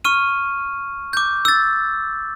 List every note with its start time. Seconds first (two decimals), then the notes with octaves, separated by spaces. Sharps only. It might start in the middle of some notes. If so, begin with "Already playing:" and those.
0.05 C#6 F6 D#7
1.13 D6 G6
1.45 E6 A6